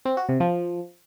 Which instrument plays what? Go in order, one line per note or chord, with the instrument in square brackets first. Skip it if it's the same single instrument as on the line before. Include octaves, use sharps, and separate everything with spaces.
[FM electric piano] C4
F#4
C3
F3